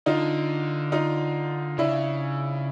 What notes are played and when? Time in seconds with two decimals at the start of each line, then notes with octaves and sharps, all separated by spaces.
0.06 D3 D#4 F4
0.92 D#4 F4
1.78 C#3 D4 E4